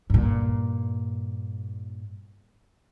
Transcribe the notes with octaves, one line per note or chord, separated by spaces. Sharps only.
G2 A#2